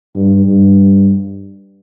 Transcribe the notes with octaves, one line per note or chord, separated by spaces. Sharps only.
G2
G2